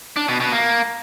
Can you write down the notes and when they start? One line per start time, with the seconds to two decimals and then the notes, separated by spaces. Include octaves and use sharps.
0.16 D4
0.28 B2
0.40 B2
0.52 A#3